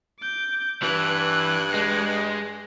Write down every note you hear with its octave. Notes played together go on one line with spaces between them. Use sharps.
D6 G6
G2 E3 F#6 G#6
G#3